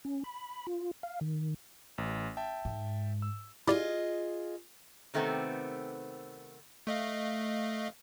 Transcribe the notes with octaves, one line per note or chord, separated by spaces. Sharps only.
C#4
B5
F4
F5
D#3
A1
E5 G5 A5
G#2
E6
E4 F4 G4 G#4 D5 D#5
C3 D#3 A3 B3 C4
A3 D#5 F5